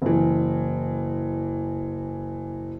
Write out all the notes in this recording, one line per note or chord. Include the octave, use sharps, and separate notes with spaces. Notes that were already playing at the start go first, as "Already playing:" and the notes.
F#1 E3